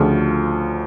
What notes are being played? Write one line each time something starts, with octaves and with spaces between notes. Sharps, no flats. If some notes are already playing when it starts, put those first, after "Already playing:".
Already playing: D2 C#3 F3 A3 F4